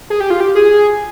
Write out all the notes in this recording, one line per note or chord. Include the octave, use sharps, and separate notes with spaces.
G#4
G4
F4
G4
G#4